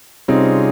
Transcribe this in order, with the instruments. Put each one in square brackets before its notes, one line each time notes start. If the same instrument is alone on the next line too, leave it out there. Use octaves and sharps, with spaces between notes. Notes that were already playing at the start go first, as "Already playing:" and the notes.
[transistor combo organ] C3 G3 C#4 F4 G#4 [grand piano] C4 D#4